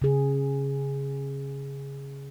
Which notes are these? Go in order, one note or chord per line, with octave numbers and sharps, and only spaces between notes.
C#3 G#4